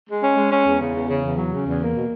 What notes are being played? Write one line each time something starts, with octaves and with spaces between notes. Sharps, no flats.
G#3
C#4
G#3
C#4
E2
C#3
E2
C#3
E2
F#3
C#3
E2
A#3
B2